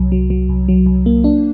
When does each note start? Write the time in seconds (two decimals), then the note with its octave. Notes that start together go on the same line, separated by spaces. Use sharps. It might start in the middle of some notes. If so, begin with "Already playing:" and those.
Already playing: C2 F#3
0.12 F#3
0.30 F#3
0.49 C2
0.68 F#3
0.86 C2
1.06 A#3
1.24 D4